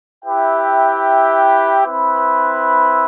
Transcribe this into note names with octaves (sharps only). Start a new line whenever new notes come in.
E4 G4 B4 E5 G5
C4 E4 B4